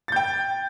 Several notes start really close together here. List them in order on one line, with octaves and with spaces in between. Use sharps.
A6 G6 G5